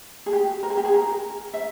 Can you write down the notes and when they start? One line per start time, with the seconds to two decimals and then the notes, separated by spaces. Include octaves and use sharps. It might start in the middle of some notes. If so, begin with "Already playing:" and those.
0.26 G#4
0.33 G4
0.63 A#4
0.70 G#4
0.77 G4
0.84 G#4
0.93 A#4
1.54 E5